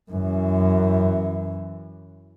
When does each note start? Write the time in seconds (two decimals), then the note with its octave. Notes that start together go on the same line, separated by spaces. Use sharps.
0.11 F#2 E3